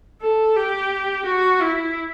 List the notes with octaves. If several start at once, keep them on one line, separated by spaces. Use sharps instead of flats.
A4
G4
F#4
E4